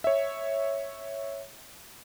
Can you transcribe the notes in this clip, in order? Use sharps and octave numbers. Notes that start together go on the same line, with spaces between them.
C#5 E5